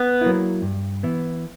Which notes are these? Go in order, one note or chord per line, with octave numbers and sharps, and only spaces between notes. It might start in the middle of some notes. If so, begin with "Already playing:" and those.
Already playing: B3
F#3 A#3 E4
G2
E3 B3 E4